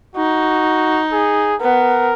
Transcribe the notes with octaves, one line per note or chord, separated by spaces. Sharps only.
D#4 F#4
G#4
B3 A#4